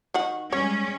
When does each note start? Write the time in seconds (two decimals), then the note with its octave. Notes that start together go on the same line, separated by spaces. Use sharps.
0.14 D#3 F#4 F#5
0.52 G3 G#3 C#4 C#5